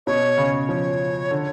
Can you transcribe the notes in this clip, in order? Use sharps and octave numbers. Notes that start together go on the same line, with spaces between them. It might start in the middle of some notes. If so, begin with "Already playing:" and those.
B2 C#5
C#3
F3 C#5
D3